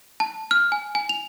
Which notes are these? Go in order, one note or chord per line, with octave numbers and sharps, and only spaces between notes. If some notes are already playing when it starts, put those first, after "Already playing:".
A5
F6
G#5
G#5
F7